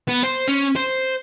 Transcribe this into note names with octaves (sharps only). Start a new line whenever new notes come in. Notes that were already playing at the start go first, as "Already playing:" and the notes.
B3
C5
C#4
C5